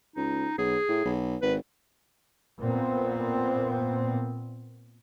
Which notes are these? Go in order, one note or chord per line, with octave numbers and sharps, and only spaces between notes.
C#2 D#4
B1 G#4
A2
B1
G#1 B4
A#2 B3 C4